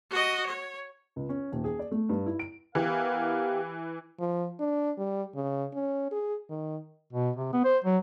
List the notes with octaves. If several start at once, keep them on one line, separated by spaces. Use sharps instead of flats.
F#4 D#5
C#5
C#2
C#4
D#1
G#4
D5
A3
G2
E4
D7
E3 B3 G4 A#4 F5
F3
D4
G3
C#3
C#4
G#4
D#3
B2
C3
B3
C5
F#3